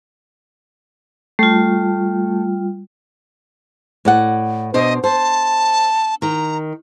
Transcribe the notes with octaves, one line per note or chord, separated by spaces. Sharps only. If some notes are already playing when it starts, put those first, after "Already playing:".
G3 A3 F4
A2 D5 F#5
B2 D4 C5 D#5
C5 A5
D#3 A#5